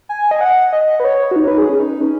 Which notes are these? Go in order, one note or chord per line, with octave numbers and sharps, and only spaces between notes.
G#5
D#5
F#5
D#5
B4
C#5
F#4
D#4
B4
G#4
C#4
D#4
C#4